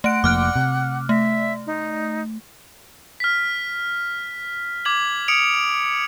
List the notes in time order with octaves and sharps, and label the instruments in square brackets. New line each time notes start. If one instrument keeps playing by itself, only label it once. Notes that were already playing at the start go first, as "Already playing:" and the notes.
[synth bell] A3 D7 [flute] F#5
[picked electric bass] F1 F3 A#3 [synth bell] D6 F6 F#6
[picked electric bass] C3
[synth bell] A3 [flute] E5
[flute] D#4
[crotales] F6 B6
D6 G#6 F#7
D#6 C#7 D7 F7